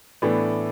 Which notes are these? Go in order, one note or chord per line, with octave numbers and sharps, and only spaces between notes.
A2 E3 B3 D4 A4